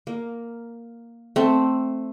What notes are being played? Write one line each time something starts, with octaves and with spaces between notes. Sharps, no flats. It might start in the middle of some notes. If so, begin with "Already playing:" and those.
A#3
A3 C4